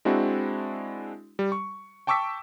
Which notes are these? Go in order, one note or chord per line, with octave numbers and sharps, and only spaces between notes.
G#3 C4 D4 E4 F#4
G3
C#6
G5 A5 C#6 D6 E6 B6